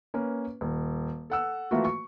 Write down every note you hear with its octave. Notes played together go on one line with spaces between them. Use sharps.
A#3 C#4 B4
D#1
A4 F#5 E6
E3 F#3 A3 A#3 F4 F#4
C#6